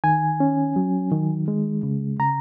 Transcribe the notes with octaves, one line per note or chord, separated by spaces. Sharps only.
D#3 G#5
C#4
F#3
D#3
G#3
C#3
C#3 A#5